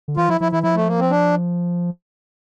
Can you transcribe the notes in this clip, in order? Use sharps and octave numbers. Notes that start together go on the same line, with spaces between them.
D3
E3 F4
F3 E4
F3 E4
E3 E4
F3 E4
A3
A#3
C4
D4